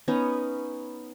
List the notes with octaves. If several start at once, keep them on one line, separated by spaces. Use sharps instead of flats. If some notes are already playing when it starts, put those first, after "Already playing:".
B3 C#4 D#4